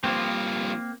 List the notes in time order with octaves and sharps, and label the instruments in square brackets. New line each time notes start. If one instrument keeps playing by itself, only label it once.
[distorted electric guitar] G2 F3 [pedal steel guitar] A#3 C4